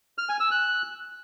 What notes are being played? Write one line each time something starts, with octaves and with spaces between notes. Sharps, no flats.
F6
G#5
E6
F#6